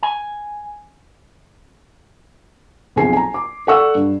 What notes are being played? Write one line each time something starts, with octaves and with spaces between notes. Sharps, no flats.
G#5
B1 F2 G#4 G#5 C7
G#5 A#5
D6
A4 D5 F#5 C#6 E6
G2